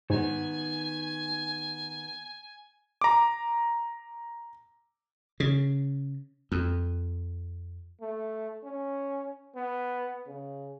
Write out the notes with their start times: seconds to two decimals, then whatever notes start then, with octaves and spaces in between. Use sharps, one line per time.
0.10 G#2 D#3 B3 G#5
3.01 A#5 D6
5.40 C#3
6.52 F2
8.01 A3
8.64 C#4
9.56 B3
10.27 C#3